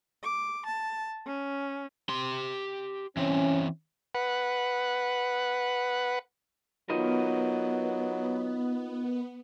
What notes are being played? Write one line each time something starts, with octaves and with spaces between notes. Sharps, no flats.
D6
A5
C#4
G4 C6
E3 C4 C#4
B4 F#5
F#3 B3 D#4 F4 A#4 B4 D#5